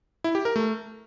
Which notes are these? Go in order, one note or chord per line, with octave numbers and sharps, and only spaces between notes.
E4
G4
A#4
A3